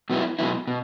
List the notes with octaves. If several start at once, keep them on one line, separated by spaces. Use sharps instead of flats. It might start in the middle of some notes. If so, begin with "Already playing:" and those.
B2 F#3 B3 E4
B2 F#3 B3 E4
B2